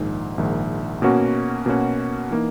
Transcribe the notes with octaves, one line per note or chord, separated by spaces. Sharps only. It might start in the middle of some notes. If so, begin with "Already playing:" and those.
Already playing: A#1 G#2 D#3
A#1 G#2 D#3
B2 A#3 C#4 F#4
B2 A#3 C#4 F#4
E3 A#3 D#4